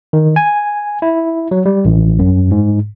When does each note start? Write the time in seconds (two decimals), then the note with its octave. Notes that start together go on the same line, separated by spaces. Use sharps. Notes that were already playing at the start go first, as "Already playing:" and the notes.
0.13 D#3
0.36 G#5
1.02 E4
1.51 F#3
1.66 G3
1.85 A1
2.19 F#2
2.51 G#2